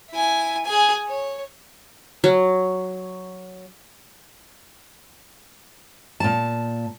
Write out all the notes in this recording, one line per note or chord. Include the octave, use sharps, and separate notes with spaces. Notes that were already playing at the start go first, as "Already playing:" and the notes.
E4 G#5
G#4 G#5
C#5
F#3
A#2 A5